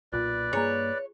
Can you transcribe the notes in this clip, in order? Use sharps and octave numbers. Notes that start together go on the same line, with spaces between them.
B1 A#2 F4 B4 D5
G2 A#3 G#4 C#5 G#5 A#5